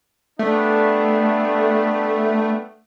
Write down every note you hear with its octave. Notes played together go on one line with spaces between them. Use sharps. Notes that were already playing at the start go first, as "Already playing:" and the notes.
G3 A3 B3 D4